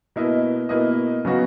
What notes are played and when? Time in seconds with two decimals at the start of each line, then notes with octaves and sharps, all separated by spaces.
0.16 B2 A#3 E4 B4 D#5
0.69 B2 A#3 E4 B4 D#5
1.25 C#3 F#3 B3 D#4 F#4